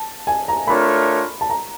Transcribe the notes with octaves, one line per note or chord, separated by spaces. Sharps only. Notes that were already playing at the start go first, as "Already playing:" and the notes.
Already playing: A5
G#5
A#5
A3 D4 F4 A#4 C#5 B5
A5
A#5